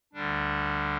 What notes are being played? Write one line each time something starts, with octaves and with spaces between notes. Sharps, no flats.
D2 D3 G3 D4